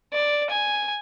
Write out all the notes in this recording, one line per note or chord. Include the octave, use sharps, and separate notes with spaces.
D5
G#5